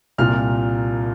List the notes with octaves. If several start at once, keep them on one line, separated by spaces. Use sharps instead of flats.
C2 A#2 F6